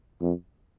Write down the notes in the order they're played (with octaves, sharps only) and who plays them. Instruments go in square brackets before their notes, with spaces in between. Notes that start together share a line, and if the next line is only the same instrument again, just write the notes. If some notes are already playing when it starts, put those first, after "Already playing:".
[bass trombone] F2